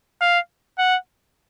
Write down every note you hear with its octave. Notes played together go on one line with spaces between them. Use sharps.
F5
F#5